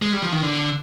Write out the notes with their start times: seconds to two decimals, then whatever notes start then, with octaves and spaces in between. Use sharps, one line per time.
0.02 G#3
0.13 G3
0.22 F3
0.32 D#3
0.42 D3